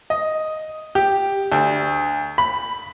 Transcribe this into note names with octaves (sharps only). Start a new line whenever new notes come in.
D#5
G4
D2
B5